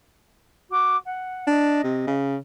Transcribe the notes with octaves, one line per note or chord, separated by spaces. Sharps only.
F#4 D6
F#5
D4 D#5
C3
C#3